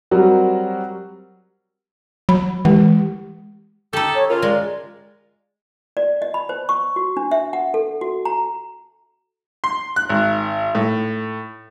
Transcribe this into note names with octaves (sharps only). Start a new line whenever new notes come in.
F#3 G3 C4 F#4 A#4
F#3 B5
E3 G#3 G4
D#4 G4 A4
C#5
C#3 F4 A#4
G#3 D5
D5
D#5
B5
C5
C#6
F#4
D4
E5
F#5
A4
F#4
A#5
C6
F#6
G#1
A2